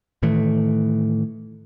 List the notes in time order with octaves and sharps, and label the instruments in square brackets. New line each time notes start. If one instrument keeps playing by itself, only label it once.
[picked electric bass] A2 D#3 E3 A3